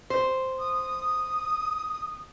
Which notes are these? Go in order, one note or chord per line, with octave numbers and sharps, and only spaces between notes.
C5
D#6